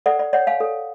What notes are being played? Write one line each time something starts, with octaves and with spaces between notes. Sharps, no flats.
A4 D5 F#5
D5
C#5 D5 F#5
F5 G#5
A4